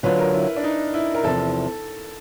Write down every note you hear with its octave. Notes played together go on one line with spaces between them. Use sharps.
D3 F#3 B3 D4 F4 B4
A#4
E4
D4
D#4
E4
A#4
E2 C3 F3 A4